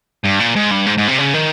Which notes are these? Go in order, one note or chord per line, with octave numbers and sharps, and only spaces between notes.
G2
A#2
G#2
G2
G#2
G#2
C3
C#3
D#3